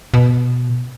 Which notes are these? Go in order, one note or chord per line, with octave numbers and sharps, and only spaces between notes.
B2